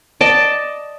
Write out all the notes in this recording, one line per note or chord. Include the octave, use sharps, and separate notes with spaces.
D5 D#5 A5